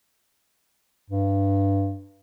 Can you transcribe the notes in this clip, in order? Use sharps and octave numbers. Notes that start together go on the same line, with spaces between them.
G2